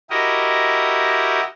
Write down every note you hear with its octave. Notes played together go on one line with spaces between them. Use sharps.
E4 F#4 G4 A#4 D#5